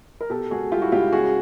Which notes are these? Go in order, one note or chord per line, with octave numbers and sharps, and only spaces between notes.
A#4
B2 G4 A4
C#2 F#4 G#4
G3 F4 G4
E4 F#4
C#2 F4 G4
C#3 F#4 G#4